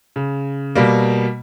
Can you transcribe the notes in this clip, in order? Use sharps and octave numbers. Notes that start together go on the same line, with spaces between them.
C#3
B2 G3 A#3